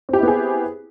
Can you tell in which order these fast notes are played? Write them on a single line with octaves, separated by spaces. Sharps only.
C4 G4 E4 B3 G#4